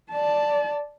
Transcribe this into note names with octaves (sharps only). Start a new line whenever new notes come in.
D5 A5